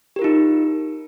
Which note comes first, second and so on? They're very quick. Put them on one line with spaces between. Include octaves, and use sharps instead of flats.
G4 A#4 F4 D#4